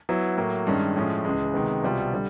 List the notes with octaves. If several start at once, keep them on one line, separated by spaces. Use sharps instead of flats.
F#3 B3 E4
A2 F#3 A#3
G2 D#3 G#3 C#4
A2 F3 G#3 C#4
C#2 C#3 E3 G#3
C3 D#3 G#3 B3
C2 B2 G3 C4 F4
D3 G3